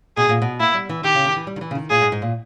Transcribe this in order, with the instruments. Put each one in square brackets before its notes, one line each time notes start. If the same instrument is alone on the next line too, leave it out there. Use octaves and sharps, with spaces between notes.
[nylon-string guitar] B2 [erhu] G#4
[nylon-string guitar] A#2
B2
[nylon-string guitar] A#3 [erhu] E4
[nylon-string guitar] G3
E3
[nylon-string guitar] D#3 [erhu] G4
[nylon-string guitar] C#3
D#3
E3
G3
D#3
E3
C#3
D#3
[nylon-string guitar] A#2 [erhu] G#4
[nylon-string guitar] G#2
G#2
A#2